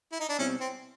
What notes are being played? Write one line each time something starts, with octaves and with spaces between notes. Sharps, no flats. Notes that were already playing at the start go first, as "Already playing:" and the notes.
E4
D#4
D4
B2 G3 C4 C#4 E4
C4